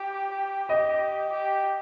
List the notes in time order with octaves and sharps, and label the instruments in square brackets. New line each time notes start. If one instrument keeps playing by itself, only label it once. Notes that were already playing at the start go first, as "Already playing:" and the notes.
Already playing: [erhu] G4
[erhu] G4 [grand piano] D#5
[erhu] G4